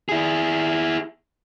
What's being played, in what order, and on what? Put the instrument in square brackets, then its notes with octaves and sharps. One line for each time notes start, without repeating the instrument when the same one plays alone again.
[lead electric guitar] E4 G#4